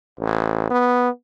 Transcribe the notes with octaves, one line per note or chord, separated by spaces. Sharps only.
A1
B3